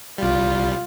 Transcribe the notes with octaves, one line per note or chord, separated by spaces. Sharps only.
C2 G3 F4